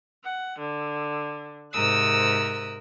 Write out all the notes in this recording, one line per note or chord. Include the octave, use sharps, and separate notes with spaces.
F#5
D3
G#2 C3 A#4 D#6 E6 F#6